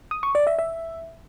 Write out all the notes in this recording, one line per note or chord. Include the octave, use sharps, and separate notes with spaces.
D#6
C#6
D5
E5
E5